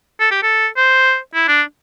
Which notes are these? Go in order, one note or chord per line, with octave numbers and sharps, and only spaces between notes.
A4
G4
A4
C5
E4
D4